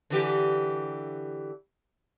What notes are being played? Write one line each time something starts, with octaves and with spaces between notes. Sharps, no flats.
D3 E3 G4